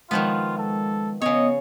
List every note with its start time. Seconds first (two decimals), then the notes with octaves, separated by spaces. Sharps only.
0.11 D#3 F3 G#3 B3 F4
0.58 A4
1.22 C#3 B3 C#5 D#5